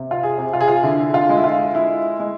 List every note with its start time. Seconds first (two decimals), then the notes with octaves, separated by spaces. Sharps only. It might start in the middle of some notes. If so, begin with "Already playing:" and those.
Already playing: C3
0.11 F4
0.23 G#4
0.38 C3
0.53 F4
0.61 G#4
0.68 F4
0.83 D3 E4
1.14 F4
1.29 G#3
1.37 E4
1.44 F4
1.74 G#3 E4
2.20 G#3